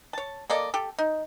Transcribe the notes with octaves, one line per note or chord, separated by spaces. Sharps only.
C#5 A5
A#3 A4 D5 D#5
G4 A4
D#4